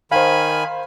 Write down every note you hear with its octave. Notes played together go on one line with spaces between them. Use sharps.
D#3 C5 F5 G#5 B5